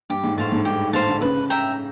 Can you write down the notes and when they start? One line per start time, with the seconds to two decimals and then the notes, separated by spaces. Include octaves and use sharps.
0.10 G2 G4
0.24 G#2
0.38 A2 C5 F5 A5
0.52 G#2
0.65 G2 G4
0.93 G#2 C5 F5 A5
1.07 D3
1.21 C#3 B4
1.50 E5 G5 A#5